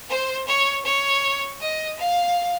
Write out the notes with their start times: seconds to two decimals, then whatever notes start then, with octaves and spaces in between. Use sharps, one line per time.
0.10 C5
0.47 C#5
0.85 C#5
1.61 D#5
1.99 F5